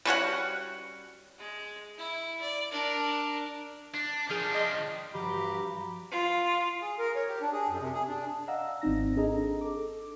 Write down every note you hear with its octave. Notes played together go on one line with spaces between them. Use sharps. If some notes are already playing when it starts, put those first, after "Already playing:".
G3 C#4 F#4 F#5
G#3
E4
D5
D4 A#4
D4
F3 D4 G#4 F6 G6
D#5 G5 C6
G2 F3 F#4 G4 A#5 B5
F4
G#4
A#4
C#5
G4
D4
G#4
F#2
C3
G#4
D4
D5 D#5 F5 F#5 A#5 E6
G#1 C4 D#4 A#6
C4 D4 G#4 A4 D#5 A#5
A4 D6